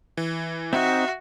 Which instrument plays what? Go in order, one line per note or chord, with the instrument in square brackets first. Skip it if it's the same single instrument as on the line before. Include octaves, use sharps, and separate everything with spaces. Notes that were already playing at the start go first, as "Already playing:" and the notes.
[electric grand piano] E3
[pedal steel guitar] C4 D#4 [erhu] F#4 [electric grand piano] E5